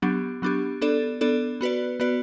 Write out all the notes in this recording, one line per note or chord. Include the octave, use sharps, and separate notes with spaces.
F#3 B3 D4 G4
F#3 B3 D4 G4
B3 D4 A4 D5
B3 D4 A4 D5
B3 F#4 B4 D5
B3 F#4 B4 D5